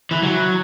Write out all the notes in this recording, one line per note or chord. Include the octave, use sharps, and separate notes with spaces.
E3
F#3